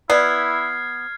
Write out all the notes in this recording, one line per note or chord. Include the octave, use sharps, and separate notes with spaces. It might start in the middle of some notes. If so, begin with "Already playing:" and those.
B3 E4 D5 F6 G#6 C7